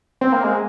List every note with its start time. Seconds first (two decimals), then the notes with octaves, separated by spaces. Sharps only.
0.21 C4
0.33 A#3
0.44 G#3